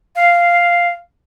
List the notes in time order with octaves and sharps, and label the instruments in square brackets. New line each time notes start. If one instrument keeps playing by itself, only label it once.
[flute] F5